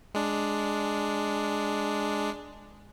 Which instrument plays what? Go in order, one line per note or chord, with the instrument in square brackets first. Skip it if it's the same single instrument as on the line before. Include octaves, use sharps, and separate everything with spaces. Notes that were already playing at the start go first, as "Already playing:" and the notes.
[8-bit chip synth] G#3 D4